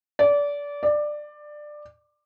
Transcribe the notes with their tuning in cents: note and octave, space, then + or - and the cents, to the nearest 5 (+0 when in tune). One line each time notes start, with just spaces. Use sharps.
D5 -25
D5 +15